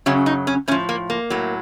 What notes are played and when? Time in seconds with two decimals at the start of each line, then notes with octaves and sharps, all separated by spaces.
0.06 F#2 C#3 F#3 C#4
0.26 D#4
0.47 C#4
0.68 A2 C#4
0.72 F3
0.89 A#3
1.10 A#3
1.30 A2 F#3